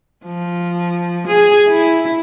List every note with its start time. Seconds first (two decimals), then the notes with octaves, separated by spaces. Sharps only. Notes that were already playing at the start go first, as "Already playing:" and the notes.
0.25 F3
1.27 G#4
1.69 E4